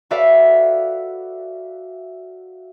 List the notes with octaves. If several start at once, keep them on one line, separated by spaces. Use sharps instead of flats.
F#4 A4 B4 D5 E5 F5